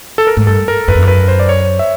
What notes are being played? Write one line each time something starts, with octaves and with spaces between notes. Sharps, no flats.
A4
A#4
G#2
G2 A4
A#4
F#2 B4
F2
F#2
B4
C5
D5
C#5
E5